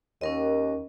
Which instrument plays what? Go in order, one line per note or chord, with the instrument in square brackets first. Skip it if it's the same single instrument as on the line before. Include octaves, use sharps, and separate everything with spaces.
[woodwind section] D#2 [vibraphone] C#4 A#4 D#5